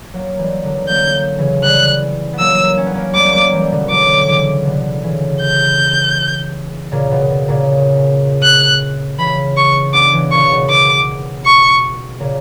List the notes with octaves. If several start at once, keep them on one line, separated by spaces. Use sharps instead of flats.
F#3 A#3
E3 G3
D3 F#3
F#3 A#3 G6
C#3 E3
E3 G3 F#6
B3
F#3 A#3 E6
C#4
B3
A#3 C#4
G3 B3 D6
F#3 A#3
E3 G3
B2 D3
D3 F#3 D6
C#3 E3
B2 D3
C#3 E3
G6
A#2 C#3
B2
B2
A#2 C#3
F#6
C#3 E3 B5
C#6
B3 D4 D6
C#3 E3
A#2 C#3 C#6
B2
B2 D6
C#6
A#2 C#3